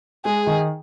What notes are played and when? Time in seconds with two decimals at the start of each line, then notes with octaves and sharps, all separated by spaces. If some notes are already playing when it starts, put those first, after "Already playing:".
0.25 G#3 G#4
0.46 D#3